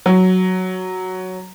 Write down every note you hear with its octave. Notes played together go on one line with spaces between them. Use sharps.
F#3